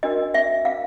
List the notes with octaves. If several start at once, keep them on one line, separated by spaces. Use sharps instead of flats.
D4 F#4 A#4 D#5
E5
F5